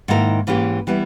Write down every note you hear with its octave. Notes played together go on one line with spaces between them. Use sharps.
G#2 D#3 A#3 E4 A#4
G#2 E3 A#3 C#4 G4
E3 G3 B3 E4